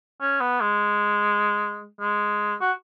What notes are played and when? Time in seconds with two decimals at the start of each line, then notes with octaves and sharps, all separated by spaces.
0.21 C#4
0.40 B3
0.61 G#3
2.01 G#3
2.61 F#4